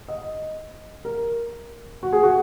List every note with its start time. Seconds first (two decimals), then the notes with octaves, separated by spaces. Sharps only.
0.08 D#5
1.05 A#4
2.03 F#4
2.13 G#4
2.23 F#4